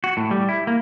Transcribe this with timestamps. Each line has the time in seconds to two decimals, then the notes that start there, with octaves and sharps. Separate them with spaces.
0.04 F#4
0.17 A2
0.31 G3
0.49 E4
0.67 A#3